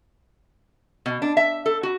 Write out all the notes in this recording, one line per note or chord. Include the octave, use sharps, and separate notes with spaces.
B2
D4
E5
A4
F#4